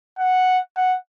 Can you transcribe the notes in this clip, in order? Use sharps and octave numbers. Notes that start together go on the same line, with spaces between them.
F#5
F#5